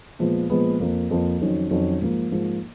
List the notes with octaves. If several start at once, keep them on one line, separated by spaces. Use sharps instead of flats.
A#2 F3 G#3 B3
A#2 F3 G#3 B3
F2 F3 A#3
F2 F3 A#3
F2 D#3 F#3 C#4 F#4
F2 D#3 F#3 C#4 F#4
G#2 F3 A#3
G#2 F3 A#3